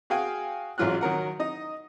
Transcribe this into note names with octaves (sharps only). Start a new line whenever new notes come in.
F#4 G#4 F5 G5 G#5
A1 G#2 F#3 F4 F6 F#6
D#3 F#3 A#4 F#5
D#4 D#5